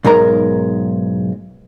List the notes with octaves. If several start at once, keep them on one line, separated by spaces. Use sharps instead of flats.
B1 G#2 G#3 A#4 A#5